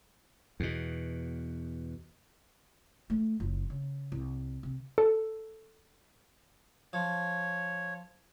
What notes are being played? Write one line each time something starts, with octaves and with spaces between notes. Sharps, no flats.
E2 B2
A3
F#1 F4
C#3
C2
C3
A4
F3 C#5